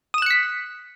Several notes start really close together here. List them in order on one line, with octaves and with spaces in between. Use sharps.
D#6 E7 F#6 C#7 B6